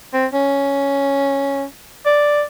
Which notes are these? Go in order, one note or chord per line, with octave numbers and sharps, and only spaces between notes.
C4
C#4
D5